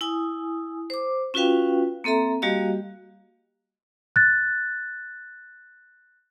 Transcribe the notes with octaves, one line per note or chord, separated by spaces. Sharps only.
E4 G#5 D#6
C5 D6
C#4 F4 F#4 B4 F5 G5
A#3 C4 A4 E5 A#5
G3 A#3 F#4 G4 D#5 F5
F#6 A6